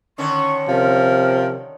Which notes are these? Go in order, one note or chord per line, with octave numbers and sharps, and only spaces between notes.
D3 D#3 C#4 C#6
C3 F3 A#4